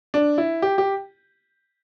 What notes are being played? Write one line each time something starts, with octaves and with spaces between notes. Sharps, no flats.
D4
E4
G4
G4